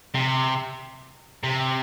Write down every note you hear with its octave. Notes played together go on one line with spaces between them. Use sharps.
C3
C3